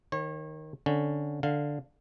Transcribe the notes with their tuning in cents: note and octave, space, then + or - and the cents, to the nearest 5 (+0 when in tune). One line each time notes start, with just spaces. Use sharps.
D#3 +0 C#5 -35
D3 +0 C#4 +0
D3 +0 F5 +0